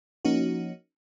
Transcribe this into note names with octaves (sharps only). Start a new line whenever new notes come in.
F3 A#3 C#4 D#4 F#4